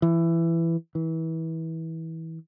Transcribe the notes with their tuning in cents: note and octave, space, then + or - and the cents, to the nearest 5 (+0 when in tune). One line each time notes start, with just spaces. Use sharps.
E3 +15
E3 -25